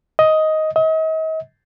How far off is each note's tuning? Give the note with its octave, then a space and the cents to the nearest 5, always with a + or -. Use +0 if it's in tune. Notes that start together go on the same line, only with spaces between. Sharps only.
D#5 +10
D#5 +40